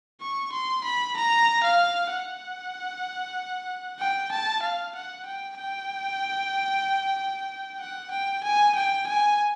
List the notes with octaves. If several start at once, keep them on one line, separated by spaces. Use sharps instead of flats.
C#6
C6
B5
A#5
F5
F#5
G5
A5
F5
F#5
G5
G5
F#5
G5
G#5
G5
G#5